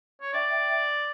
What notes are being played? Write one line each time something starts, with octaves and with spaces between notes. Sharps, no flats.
C#5
D5 E5 G5
E5 G5